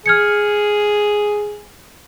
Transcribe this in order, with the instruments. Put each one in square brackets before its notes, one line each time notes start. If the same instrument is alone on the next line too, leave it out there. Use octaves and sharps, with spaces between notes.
[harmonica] G#4 [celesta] F6 G#6 C#7